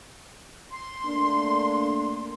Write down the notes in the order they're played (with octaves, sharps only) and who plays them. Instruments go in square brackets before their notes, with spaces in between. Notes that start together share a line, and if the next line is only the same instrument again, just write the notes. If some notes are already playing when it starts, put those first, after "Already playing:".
[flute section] C6
[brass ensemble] A3 A#3 D4